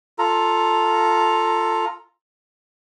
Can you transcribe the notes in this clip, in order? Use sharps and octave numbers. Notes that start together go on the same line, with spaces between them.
F4 A4 A#5